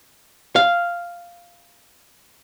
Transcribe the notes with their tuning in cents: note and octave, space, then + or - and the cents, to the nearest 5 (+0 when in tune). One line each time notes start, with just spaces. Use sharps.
F5 -5